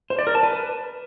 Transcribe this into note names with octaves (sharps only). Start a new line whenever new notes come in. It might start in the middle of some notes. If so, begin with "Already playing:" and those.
C5
D5
A#4
A5
B4